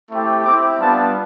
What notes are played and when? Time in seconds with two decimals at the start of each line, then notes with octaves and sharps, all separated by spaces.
0.10 A3 C4 E4 G4
0.44 C4 E4 G4 D6
0.79 G3 B3 D4 F4 A5